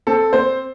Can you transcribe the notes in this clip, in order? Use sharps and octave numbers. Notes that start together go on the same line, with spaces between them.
C4 A4
C4 C5